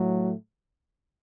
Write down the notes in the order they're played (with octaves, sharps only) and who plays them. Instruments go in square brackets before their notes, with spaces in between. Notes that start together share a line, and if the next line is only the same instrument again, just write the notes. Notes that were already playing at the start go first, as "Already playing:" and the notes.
Already playing: [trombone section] A2 F#3 A3